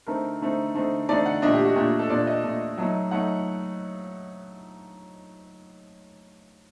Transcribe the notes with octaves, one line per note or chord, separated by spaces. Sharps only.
D3 A3 C4 D#4 A#4
D3 A3 C4 D#4
D3 A3 C4 D#4
D3 A3 C4 D#4 D5
F#5
A#2 A3 D4 D#5
G4
F#4
A#2 A3 D4 G4
G4
A4
A#2 A3 D4 D5
D#5
A#2 A3 D4
F#3 A3 D#4
F#3 A3 D#4 F#5